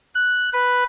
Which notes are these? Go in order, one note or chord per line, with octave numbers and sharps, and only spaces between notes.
F#6
B4